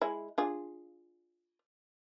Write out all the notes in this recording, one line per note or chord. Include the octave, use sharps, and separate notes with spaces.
G#3 E4
D4 F4 G#4